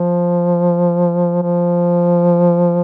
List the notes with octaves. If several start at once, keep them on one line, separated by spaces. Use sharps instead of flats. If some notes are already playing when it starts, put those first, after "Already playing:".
Already playing: F3
F3